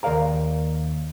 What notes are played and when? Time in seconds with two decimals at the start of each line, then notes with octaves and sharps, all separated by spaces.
0.03 D#2 A#4 D5 F5 A#5